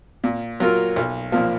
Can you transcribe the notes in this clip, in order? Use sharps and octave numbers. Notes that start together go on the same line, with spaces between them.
A#2
F#3 A#3 F4 A#4
B1
A#2 F3 A#3